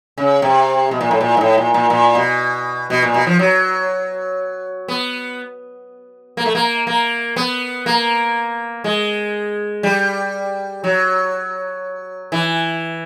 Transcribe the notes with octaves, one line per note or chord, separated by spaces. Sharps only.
C#3
C3
B2
A#2
A2
A#2
G#2
A2
A#2
A#2
A#2
B2
B2
A#2
B2
F3
F#3
B3
A#3
A3
A#3
A#3
B3
A#3
G#3
G3
F#3
E3